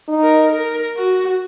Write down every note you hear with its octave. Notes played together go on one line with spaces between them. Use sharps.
D#4
A#4
A#4
F#4